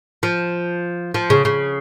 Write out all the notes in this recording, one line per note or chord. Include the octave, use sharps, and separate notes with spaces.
F3
F3
C#3
C#3